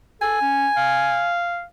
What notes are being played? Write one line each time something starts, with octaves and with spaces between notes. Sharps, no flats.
A4 G#5
C#4
F5